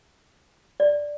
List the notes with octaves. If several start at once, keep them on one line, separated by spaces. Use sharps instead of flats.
D5